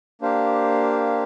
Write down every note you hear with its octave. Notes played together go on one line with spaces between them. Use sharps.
A#3 D4 G4 C5 F5